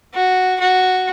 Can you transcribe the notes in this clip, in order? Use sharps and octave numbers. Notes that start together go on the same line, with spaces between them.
F#4
F#4